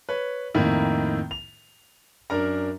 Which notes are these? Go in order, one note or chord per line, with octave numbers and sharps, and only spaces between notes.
B4 C#5
F2 A2 D#3 A#3 E4
F7
F#2 D4 A#4 A#5